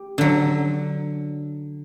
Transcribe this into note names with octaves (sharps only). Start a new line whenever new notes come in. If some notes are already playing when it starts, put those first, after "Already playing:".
Already playing: G4
D3 F#3